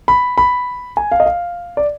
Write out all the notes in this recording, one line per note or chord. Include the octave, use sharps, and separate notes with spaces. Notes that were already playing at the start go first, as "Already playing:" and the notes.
B5
B5
G#5
F5
D#5
F5
D5